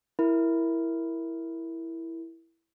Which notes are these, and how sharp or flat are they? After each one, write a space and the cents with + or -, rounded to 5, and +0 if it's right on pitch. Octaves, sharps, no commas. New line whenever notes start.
E4 +5 A#4 +0